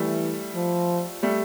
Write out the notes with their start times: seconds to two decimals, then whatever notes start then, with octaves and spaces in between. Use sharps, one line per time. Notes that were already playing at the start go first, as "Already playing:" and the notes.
Already playing: E3 G3 A3
0.55 F3
1.23 G3 A3